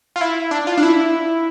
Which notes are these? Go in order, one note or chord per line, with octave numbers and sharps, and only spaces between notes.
F4
E4
D4
F4
D4
E4